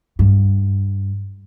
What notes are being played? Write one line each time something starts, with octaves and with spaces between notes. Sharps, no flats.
G2